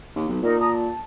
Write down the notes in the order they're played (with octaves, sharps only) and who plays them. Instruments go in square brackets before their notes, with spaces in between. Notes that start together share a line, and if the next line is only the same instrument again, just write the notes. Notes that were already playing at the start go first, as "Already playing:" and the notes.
[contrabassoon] D#2
B1
[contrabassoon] A#2 [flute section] D#4 A#4
[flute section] A5 A#5 D#6
A5